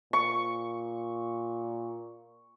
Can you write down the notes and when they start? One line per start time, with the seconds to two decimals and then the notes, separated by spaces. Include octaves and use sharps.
0.13 A#2 C#6